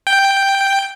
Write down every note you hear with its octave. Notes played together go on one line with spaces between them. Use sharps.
G5